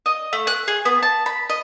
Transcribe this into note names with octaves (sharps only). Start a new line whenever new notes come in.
D#5
A3
F#6
G#4
B3
A5
B5
D#5